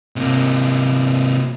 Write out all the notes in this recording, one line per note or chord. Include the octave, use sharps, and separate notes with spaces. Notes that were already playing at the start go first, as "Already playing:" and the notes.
C3 A#3